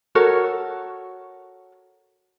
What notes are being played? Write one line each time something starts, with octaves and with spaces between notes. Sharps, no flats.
F#4 A4 A#4 C#5